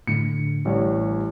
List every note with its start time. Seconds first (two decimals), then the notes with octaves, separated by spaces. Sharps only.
0.07 A2 D3 C#7
0.65 A1 G3 C#5